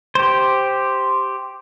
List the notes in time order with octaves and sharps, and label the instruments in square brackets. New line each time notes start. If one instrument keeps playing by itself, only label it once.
[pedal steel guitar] G4 C5